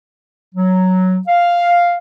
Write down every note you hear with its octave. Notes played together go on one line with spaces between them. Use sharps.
F#3
F5